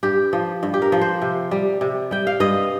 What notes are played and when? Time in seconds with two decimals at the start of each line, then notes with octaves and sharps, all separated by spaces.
0.03 G2 G4
0.33 F3
0.63 G2
0.74 G4
0.82 A#4
0.92 F3
1.01 C5
1.22 C3
1.51 G3
1.81 C3
2.11 G3 G5
2.27 F5
2.40 G2 D#5